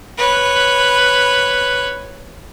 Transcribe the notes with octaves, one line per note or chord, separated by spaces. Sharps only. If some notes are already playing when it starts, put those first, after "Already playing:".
B4 C#5